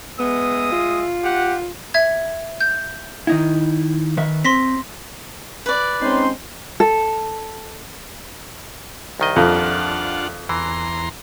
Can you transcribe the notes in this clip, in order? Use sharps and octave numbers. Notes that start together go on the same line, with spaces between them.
G#3 B3 E5 D#6
F4
G4 F#5
E5 G#6
G6
D#3 D#4 E4
D#3 B4 E5
C4 C6 A#6 B6
B4 D5
G#3 C4 C#4 D#4 C6
A4
C2 D#3 D#5
F2 D4 F4 F#5
E2 E3 A#5 C6